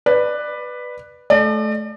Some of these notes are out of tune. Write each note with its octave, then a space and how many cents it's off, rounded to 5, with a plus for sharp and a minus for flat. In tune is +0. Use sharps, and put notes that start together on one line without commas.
B4 +0 D5 +20
A3 -25 D5 +40